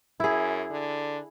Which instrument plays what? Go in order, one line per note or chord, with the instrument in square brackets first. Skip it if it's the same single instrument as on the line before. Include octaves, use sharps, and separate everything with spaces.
[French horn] F#2 [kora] E4 G#4
[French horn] D3